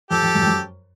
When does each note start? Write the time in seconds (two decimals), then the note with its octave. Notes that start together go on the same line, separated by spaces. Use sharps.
0.11 F2 G4 A4
0.23 F2
0.35 F#2
0.41 F2
0.47 F#2